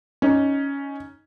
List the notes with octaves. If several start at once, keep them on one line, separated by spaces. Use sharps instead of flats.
C#4 D#4